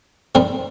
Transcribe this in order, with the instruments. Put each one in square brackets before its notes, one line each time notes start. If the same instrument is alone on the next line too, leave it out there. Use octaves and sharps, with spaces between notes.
[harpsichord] G#2 G3 C4 D#4 A#4